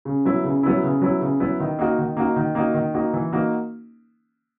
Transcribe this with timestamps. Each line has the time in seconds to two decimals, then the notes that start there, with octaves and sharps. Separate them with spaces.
0.05 C#3
0.25 F#3 B3 E4
0.44 C#3
0.63 F#3 B3 E4
0.83 C#3
1.01 F#3 B3 E4
1.21 C#3
1.40 F#3 B3 E4
1.60 D#3
1.79 A#3 D#4 F#4
1.98 D#3
2.17 A#3 D#4 F#4
2.36 D#3
2.55 A#3 D#4 F#4
2.74 D#3
2.94 A#3 D#4 F#4
3.13 E3
3.33 A#3 D#4 F#4